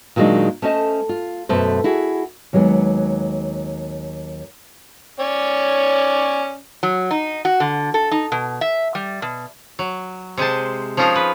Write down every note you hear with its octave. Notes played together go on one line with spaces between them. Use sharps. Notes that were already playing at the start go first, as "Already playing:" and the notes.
A#2 D#3 F#3 G#3 D4 D#4
A3 C#4 C5 D#5 A5
F4
F#2 B2 A3 B4 C5
E4 F#4 G#4
D#2 F#3 G#3 B3
C#4 C#5 D5
F#3
D#4
F#4
D3
A4
D#4
B2
E5
G3
B2
F#3
C3 G#3 C5 A5
F3 C#4 D#4 F4 G#4 A#4
B4